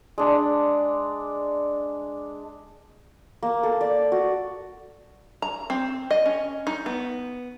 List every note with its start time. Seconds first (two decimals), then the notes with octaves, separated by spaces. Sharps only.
0.18 G#3 D4
3.43 A#3
3.63 A4
3.81 D5
4.12 F#4
5.42 A#5
5.70 C4
6.11 D#5
6.26 C#4
6.67 D#4
6.86 B3